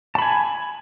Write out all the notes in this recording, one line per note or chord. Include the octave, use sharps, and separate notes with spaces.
G#5 A5 B5